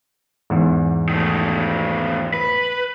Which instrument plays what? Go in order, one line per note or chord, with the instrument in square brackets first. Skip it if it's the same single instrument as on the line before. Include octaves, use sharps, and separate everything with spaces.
[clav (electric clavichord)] E2 G#2
[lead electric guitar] D#3 A3
B4